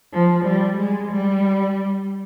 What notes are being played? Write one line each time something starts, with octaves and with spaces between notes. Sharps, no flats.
F3
G3
G#3
G3